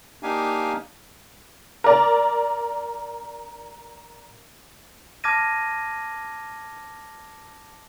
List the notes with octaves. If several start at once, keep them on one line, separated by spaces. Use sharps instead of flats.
A#3 D4 D#4 G4 F5 G#5
A#4 D5
A5 D6 F6 G#6 A#6 D#7